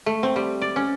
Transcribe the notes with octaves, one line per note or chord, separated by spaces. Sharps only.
A3
C4
G3
D5
C#4